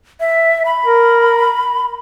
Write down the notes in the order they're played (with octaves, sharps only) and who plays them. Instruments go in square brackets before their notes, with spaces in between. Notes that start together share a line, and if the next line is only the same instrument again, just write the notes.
[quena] E5
B5
[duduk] A#4